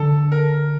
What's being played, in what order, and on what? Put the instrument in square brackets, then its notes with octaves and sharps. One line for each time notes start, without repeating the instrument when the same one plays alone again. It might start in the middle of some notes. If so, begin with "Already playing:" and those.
Already playing: [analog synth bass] D3 [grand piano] A4
[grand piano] A#4